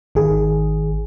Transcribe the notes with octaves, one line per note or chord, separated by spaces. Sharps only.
G#1 D#3 G#4